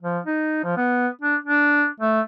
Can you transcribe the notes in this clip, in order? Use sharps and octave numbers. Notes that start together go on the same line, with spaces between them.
F3
D#4
F3
B3
D4
D4
A3